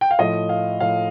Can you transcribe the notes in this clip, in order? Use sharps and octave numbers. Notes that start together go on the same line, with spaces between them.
G5
F5
A2 F3 D#5
F5
A2 F3 F5